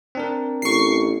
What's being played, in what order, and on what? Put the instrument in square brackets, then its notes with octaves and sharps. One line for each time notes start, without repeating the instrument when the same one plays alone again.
[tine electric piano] C4 D4 A#4
[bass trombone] A1 [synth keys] C#6 C7